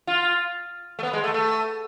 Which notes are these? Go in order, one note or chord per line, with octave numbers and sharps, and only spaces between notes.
F4
A3
B3
G#3
A3
A3